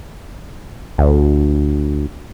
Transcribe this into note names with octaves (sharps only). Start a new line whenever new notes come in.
D2